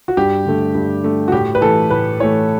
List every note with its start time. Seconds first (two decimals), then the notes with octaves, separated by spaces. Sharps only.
0.08 F#4
0.17 G2 G4
0.46 D3 A3
0.75 G2
1.03 D3 A3
1.28 F#4
1.32 A2 G4
1.55 B4
1.61 E3 A3 A4
1.90 A2 B4
2.20 E3 A3 C#5